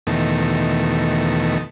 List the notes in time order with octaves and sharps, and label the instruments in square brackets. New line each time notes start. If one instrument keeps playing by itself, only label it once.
[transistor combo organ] E2 B2 D#3 A3